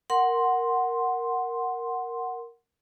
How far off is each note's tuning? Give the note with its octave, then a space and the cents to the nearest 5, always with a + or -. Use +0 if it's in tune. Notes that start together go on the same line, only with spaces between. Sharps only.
A#4 +0 F#5 +0 C6 +0